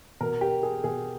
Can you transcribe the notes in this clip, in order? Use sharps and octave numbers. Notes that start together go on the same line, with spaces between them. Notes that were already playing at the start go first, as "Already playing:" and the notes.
B2 A#4
G4
G#4
B2 G#4